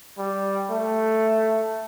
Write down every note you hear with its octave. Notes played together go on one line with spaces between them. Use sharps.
G3
A3